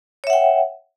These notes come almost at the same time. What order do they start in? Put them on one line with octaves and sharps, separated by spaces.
C#5 E5 F#5 G5